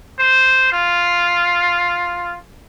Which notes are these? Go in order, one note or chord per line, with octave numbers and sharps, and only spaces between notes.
C5
F4